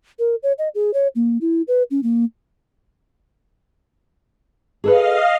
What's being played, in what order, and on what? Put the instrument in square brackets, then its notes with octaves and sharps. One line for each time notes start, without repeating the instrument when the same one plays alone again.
[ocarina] A#4
C#5
D#5
G#4
C#5
A#3
E4
B4
C#4
A#3
[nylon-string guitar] G#4 A4 B4 [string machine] D#5 F5